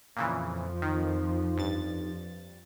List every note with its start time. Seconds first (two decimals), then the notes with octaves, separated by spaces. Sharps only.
0.17 F2 A#2 C#3 E3 F3
0.82 D#3 D#4
1.57 G2 A6